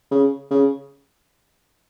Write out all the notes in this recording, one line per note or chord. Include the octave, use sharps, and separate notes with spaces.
C#3
C#3